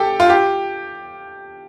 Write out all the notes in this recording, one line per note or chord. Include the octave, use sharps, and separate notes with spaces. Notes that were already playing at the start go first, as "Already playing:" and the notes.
Already playing: G4 A4
F4
G4